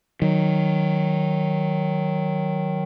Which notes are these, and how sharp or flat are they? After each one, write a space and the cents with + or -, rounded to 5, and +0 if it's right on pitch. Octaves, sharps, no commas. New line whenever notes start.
D#3 +0 F#3 +0